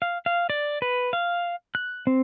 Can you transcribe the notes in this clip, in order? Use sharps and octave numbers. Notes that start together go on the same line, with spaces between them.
F5
F5
D5
B4
F5
F#6
C4